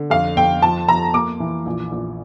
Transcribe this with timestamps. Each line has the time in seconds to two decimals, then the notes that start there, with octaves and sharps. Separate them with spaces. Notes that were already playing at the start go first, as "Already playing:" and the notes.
Already playing: D3
0.10 F2 F5
0.37 F2 G5
0.62 F3 A5
0.88 F3 A#5
1.14 A#3 D6
1.40 E3
1.66 A#1
1.92 A#1